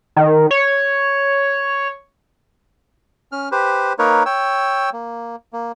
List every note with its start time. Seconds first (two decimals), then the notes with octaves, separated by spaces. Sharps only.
0.16 D#3
0.51 C#5
3.32 C#4 F6
3.52 G4 B4 C5
3.99 A#3 D#4 A#4 B4 C#5
4.26 C#5 G5 E6
4.93 A#3
5.53 A#3